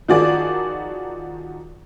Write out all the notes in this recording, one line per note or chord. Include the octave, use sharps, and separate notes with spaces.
D#3 F3 F4 F#4 G#4 D5